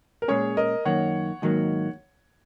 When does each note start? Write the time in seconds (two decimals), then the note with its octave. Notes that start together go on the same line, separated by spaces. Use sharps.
0.22 A#4
0.28 A#2 G#3 C#4 G#4 C#5
0.57 A#4 D#5
0.85 F#2 D#3 A#3 C#5 F#5
1.42 G#2 D#3 F#3 A#3